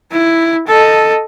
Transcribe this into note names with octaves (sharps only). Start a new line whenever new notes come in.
E4
A4 D#5